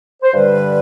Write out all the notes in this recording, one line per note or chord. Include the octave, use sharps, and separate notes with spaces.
C5
G2 D3 G3 B4